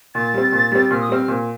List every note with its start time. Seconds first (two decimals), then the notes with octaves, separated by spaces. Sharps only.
0.15 A#2 A6
0.34 G3 C4
0.52 A#2
0.72 G3 C4
0.91 A#2 F6
1.01 D#6
1.09 G3 C4 F6
1.28 A#2